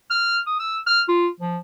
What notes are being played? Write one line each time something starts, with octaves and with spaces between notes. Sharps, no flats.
F6
D#6
E6
F6
F4
F3